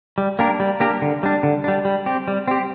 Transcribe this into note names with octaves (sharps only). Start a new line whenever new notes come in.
G3
A#3 D4 G4 A#4
G3
A#3 D4 G4 A#4
D3
G3 D4
D3
G3 D4
G3
C4 G4
G3
C4 G4